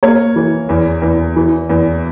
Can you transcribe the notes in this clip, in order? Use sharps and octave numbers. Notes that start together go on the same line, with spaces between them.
A#3 C#5
E3
E2
E2
E3
E2